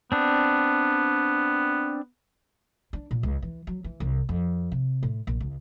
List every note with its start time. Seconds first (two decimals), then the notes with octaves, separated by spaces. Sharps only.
0.12 B3 C4 D4
2.93 D4
3.11 A#2
3.23 C#2
3.42 E3
3.67 F#3
3.84 E3
4.00 C2
4.29 F2
4.72 C3
5.03 A2
5.27 A#1
5.40 C#2